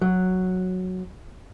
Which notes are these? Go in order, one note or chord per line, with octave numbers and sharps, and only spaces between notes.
F#3